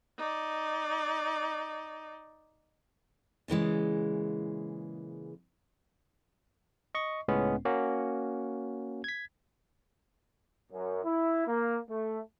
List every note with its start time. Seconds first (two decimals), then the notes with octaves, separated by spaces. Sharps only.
0.18 D#4 D5
3.48 A#2 C#3 E3 G#3
6.95 D#5 C#6
7.28 C#2 A2 G#3 B3 C#4
7.65 A#3 C#4 F#4
9.04 G#6 B6
10.71 F#2
11.03 E4
11.46 A#3
11.89 A3